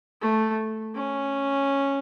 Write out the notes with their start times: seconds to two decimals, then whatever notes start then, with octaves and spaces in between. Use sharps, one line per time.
0.22 A3
0.96 C#4